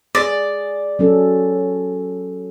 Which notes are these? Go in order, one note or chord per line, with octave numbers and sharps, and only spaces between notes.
G#4 D5
F#3 C#4 A4